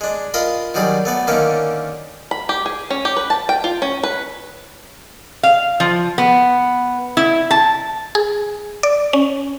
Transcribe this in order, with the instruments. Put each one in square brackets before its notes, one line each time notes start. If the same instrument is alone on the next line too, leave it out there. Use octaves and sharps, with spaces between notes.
[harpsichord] G#3 D4
F4 A#4 D#5 B5 C6
D#3 F#3 G3 G#4 D5
A3 B3 D5
D3 D#3 A#3 C#4 A4
[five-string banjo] B5
G4
G#4
C#4
G4
B4
A5
G5
F4
C#4
B4
[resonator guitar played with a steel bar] F5
F3
B3
E4
A5
[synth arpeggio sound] G#4
D5
C#4